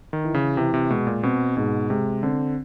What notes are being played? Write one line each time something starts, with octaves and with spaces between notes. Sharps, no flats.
D#3
E3
C#3
C3 E3
C3
B2 G#3
A#2
B2 C4
G#2 B2
C3 G#3
D3 C4